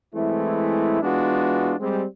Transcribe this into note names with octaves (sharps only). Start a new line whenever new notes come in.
E3 G#3 A3 C4 E4
E3 G#3 B3 D4 F4 F#4
G3 G#3 C4